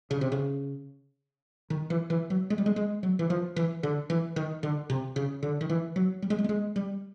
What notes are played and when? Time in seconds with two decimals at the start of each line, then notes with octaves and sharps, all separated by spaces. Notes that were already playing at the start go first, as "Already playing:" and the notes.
0.11 C#3
0.21 C3
0.32 C#3
1.70 D#3
1.90 E3
2.10 E3
2.30 F#3
2.50 G#3
2.58 G3
2.66 G#3
2.76 G#3
3.03 F#3
3.19 E3
3.30 F3
3.56 E3
3.83 D3
4.10 E3
4.36 D#3
4.63 D3
4.90 C3
5.16 C#3
5.43 D3
5.61 D#3
5.70 E3
5.96 F#3
6.22 G3
6.30 G#3
6.38 G3
6.44 A3
6.49 G#3
6.76 G3